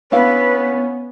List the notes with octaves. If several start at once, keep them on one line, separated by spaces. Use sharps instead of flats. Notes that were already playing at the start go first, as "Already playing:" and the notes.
B3 C#4 D4 E4 B4 F5